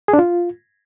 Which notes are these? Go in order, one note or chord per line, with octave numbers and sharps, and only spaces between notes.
G#4
D4
F4